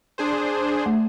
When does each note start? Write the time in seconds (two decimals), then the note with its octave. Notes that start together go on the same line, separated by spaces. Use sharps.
0.18 D4 G#4 C5
0.86 A3